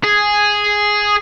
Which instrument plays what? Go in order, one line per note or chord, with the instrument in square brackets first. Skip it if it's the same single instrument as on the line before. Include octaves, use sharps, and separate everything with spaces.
[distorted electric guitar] G#4